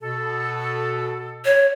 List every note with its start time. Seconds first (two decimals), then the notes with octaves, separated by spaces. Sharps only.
0.03 B2 A4
1.45 C#5